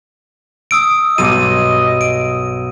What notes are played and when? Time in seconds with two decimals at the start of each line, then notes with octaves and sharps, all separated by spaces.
0.71 D#6 E6 D7
1.18 B1 G2 D#5 D6 D#7
2.01 D7